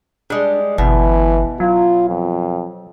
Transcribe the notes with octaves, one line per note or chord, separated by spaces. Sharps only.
G3 G#3 D4
G1 B2 E3
F#3 F4
F2